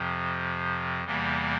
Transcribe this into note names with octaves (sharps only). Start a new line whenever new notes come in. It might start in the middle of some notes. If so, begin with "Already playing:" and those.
Already playing: F2 C3 F3
E2 C3 E3 G3 A#3